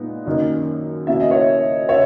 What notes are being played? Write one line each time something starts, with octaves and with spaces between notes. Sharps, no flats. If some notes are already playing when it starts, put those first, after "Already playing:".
Already playing: A#2 G#3 B3 D#4
F#2 D#3 A#3 D#4
B2 A#3 C#4 E4 E5
D#5
C#5 E5
C#3 C#5 E5